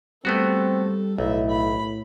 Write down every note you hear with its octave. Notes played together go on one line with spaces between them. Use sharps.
G3 A3 B3 C4 F#4 A4
B1 A2 E4 E5
B5